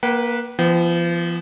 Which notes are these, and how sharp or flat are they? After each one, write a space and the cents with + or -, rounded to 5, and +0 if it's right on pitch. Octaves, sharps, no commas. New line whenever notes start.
A#3 +15 B4 -15 G5 -45
F3 -35 B3 +0 G5 -35